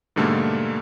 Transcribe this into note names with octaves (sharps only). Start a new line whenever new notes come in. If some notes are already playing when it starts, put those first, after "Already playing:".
G#2 B2 D3 G3 A3 A#3